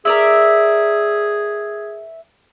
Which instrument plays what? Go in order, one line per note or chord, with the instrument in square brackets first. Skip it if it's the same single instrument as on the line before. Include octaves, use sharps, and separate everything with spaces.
[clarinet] G#4 [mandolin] A#4 D5 E5